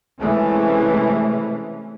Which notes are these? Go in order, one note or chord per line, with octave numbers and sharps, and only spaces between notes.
C3 E3 G#3 A3 C#4